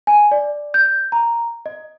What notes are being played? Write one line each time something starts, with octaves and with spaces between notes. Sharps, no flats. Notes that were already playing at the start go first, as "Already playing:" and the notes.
G#5
D5
G6
A#5
D#5